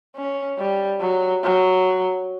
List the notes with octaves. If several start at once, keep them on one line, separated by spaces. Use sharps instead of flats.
C#4
G3
F#3
F#3